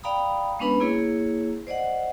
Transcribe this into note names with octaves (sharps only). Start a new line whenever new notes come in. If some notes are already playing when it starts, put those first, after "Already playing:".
D5 F5 G5 A#5 B5 D#6
G#3 B3 C#4 D4 B4 B5
A#3 E4 G#4 C#5
C5 D5 D#5 F#5